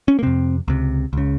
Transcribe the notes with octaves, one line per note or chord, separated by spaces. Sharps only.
C#4
A#3
F2 C3 C4
C#2 C3
C#2 C#3